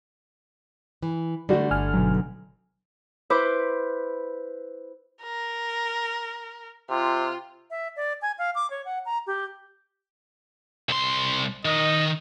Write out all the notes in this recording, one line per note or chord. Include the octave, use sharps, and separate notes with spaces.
E3
D3 G3 A3 F#4
G1 G#5 F6
B2 F#3
E4 B4 C5 D6
A#4
C3 F4
E5
D5
G#5
F5
D6
C#5
F#5
A#5
G4
C2 C6
D#3 D#5